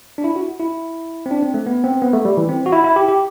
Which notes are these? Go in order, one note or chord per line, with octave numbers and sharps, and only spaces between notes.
D4
E4
F#4
E4
C4
D4
C4
A3
B3
C4
B3
A3
G3
E3
C4
F#4
E4
E4
G4
G4